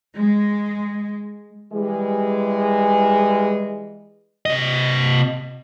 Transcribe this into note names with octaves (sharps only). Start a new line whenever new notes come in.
G#3
E3 G3 G#3
C3 D#5